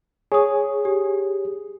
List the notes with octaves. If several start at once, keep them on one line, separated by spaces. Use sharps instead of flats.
G#4 C#5 G#5 D#6
G4